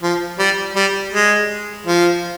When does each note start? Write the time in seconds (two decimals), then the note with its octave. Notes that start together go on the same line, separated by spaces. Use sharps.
0.03 F3
0.39 G3
0.76 G3
1.13 G#3
1.86 F3